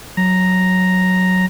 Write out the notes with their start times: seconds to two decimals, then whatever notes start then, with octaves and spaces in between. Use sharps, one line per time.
0.17 F#3 A#5